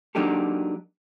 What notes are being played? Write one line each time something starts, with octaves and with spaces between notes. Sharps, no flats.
F#3 A#3 D4 D#4 G4 A4